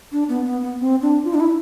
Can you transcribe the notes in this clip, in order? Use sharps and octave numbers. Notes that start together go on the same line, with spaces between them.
D4
B3
B3
B3
C4
D4
F4
D4
E4